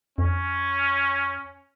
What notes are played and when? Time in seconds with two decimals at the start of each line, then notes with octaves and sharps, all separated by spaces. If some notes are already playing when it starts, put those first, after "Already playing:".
0.18 F2 C#4